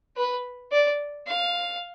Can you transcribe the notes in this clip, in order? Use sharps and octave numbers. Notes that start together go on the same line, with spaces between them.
B4
D5
F5